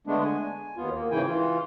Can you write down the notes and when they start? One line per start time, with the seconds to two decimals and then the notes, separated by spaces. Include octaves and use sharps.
0.07 D3 G#3 A3 B3 D4
0.24 G#5
0.77 D#2 B3 F4
0.92 A#3
1.11 G#2 C#3 E3 E4 G5 G#5
1.27 E3 F4